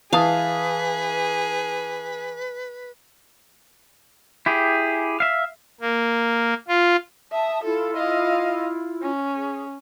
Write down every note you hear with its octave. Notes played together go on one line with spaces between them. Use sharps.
E3 G#4 B4 F5 A5 D#6
E4 G4 G#4
E5 F5
A#3
F4
E5 A5 D#6
E4 F4 A4
D#5 F5
C#4
G#4